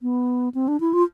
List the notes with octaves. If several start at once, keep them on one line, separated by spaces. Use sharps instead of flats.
B3
C4
D4
E4
F4